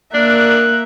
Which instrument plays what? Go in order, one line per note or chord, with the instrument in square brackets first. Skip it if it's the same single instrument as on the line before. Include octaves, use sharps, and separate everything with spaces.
[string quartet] A#3 A#4 E5 [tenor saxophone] D4 [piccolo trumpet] F#6